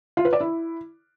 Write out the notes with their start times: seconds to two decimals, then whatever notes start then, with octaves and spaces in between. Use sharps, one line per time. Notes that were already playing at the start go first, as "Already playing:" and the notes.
0.17 F4
0.25 B4
0.33 D5
0.40 E4